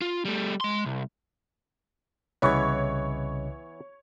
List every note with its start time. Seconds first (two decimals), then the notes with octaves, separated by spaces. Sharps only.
0.02 F4
0.25 G3 A3
0.61 G#3 C6
0.86 C2
2.42 C2 C#3 E3 B3 C#5 D#5 C#6 G#6